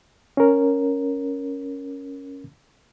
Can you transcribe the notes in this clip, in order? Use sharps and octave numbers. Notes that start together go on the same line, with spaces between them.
C#4 A#4